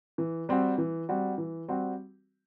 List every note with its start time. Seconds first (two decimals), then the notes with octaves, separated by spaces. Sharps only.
0.18 E3
0.49 G3 C4 F#4
0.78 E3
1.09 G3 C4 F#4
1.38 E3
1.68 G3 C4 F#4